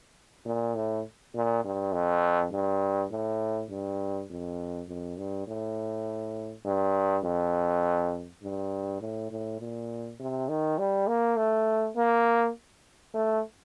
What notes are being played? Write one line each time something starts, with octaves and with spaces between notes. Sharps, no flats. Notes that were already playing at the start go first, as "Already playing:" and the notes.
A#2
A2
A#2
G2
F2
G2
A2
G2
F2
F2
G2
A2
G2
F2
G2
A2
A2
A#2
C3
D#3
G3
A#3
A3
A#3
A3